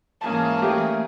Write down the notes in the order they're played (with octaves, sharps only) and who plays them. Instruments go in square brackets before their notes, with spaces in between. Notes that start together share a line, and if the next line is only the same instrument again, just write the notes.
[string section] G#2 E3 G#4 [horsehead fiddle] A#3 C#4 [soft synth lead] A5
[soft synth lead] A3 [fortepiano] G4